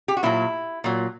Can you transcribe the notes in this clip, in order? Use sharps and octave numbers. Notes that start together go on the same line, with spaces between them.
G4
F#4
A#2 F#3 E4
A#2 F#3